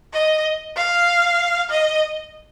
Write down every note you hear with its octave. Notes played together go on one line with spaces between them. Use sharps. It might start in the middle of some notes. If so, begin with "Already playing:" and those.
D#5
F5
D#5